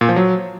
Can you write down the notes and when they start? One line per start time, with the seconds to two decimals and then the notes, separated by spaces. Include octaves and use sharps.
0.01 A#2
0.09 F3
0.16 F#3